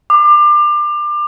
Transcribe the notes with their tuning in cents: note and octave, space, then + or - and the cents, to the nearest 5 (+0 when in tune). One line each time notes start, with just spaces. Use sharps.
D6 +25